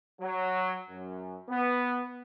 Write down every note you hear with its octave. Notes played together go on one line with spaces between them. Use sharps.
F#3
F#2
B3